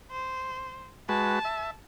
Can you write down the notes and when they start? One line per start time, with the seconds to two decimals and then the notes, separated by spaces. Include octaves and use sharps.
0.11 C5
1.09 G#3 F#4 B4 A5
1.45 E5